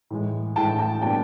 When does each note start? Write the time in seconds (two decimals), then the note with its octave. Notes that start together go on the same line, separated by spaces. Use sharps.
0.10 A2 E3 G#3
0.56 A2 E3 G#3 G5 A5
0.79 G5 A5
1.02 B2 G3 A#3 D4 G5 A5